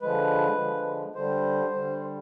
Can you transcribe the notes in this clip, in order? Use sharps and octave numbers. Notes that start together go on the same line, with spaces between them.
D3 F3 G#3 B4
D3 F3 G#3
D3 G3 C5
D3 G3